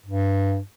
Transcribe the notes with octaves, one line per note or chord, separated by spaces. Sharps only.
G2